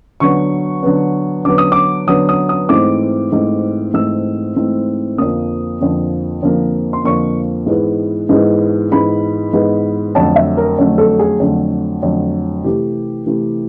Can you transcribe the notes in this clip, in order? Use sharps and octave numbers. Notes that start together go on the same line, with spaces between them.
D3 F#3 B3 C#6
D3 F#3 B3
D3 F#3 B3 D6
D#6
D6
D3 F#3 B3 D#6
D#6
D#6
G#2 E3 A3 C4 D6
G#2 E3 A3 C4
G#2 E3 A3 C4 E6
G#2 E3 A3 C4
F2 D3 F3 A#3 D#6
F2 D3 F3 A#3
F2 D3 F3 A#3
C6
F2 D3 F3 A#3 C#6
G#2 E3 G#3 B3
G#2 E3 G#3 B3
G#2 E3 G#3 B3 B5
G#2 E3 G#3 B3
F2 D3 F#3 A3 A5
E5
A#4
F2 D3 F#3 A3
A4
G#4
F2 D3 F#3 A3
F2 D3 F#3 A3
C3 E3 A3 G4
C3 E3 A3